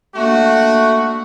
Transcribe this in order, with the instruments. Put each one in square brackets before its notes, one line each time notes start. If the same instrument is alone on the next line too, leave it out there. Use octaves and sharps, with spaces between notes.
[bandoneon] A3 [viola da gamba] A#3 D4 [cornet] F#4